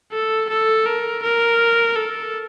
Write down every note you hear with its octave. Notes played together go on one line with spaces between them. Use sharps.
A4
A4
A#4
A#4
A4